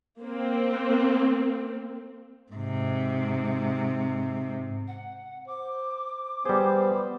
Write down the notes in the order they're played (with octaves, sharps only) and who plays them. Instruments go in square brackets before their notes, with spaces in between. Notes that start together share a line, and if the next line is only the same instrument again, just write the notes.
[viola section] A#3 C4
[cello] G#2 C3
[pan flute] F#5
[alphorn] C5 [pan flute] D6
[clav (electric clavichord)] G3 G#4 [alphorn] B3 [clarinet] C5